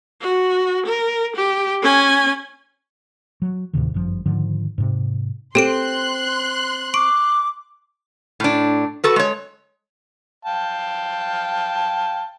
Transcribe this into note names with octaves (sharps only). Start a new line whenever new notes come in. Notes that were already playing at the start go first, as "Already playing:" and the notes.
F#4
A#4
G4
C#4 G#5
F#3
D2 A2 C3 D#3
G1 F#2 F3
G#2 D3 D#3 F3
G#2 C3
C4 G4 A4 C6 F#6 D7
C#6 D6 D7
A2 D4
F#4 A4 B4
G#3 C#5
F5 G5 A5